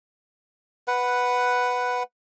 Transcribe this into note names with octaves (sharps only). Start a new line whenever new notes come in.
B4 F#5